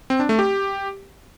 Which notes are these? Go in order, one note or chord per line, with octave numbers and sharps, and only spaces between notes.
C4
D4
A3
G4